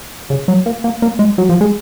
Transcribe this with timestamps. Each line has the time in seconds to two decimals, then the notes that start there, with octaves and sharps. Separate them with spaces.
0.30 C#3
0.48 F#3
0.66 A#3
0.84 A#3
1.02 A#3
1.19 G#3
1.38 F#3
1.49 F3
1.61 G#3